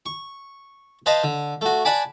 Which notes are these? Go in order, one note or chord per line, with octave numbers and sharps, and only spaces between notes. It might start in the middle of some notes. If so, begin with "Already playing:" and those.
C#6
B4 C5 D#5 F5 A5 C6
D3
A3 F#4
D5 F#5 G#5 A5 B5 D6